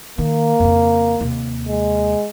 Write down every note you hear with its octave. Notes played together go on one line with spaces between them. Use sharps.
D#3 A#3 D#4
F2 C#3
D#2 C3
G#3